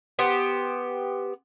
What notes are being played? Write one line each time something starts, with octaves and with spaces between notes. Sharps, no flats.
B3 G4 C5